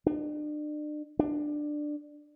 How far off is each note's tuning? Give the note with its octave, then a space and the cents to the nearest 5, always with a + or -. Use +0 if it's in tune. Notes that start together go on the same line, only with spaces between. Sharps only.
D4 +40
D4 +15